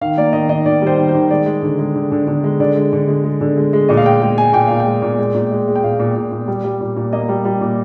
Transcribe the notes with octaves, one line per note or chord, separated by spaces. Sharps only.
D#3 F5
A#3 D5
D#3 D#5
D#3 D#5
D#3 D5
G3 C5
D#3
C5
D#3
G#3 D5
G#3
D3
G#3
D3
D3
D3
G#3
D3 D5
G#3
D3
G#3
G#3
D3
G#3
G#3
A#2 D#5
F5
G#3 G5
G#3 G5
G#3 G#5
A#2 G5
A#2 F5
G5
G#3
A#2
G#3
A#2
G#3
G#3
G5
A#2 F5
A#2
A#2
A#2
G3
G3
A#2
A#2
A#3 D#5
G3
G3
A#2